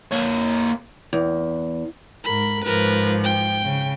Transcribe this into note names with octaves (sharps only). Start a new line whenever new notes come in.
A#3 C#5
E2
G#2 A#4 B5
G#2 F3 A#4 B4
G5
C#3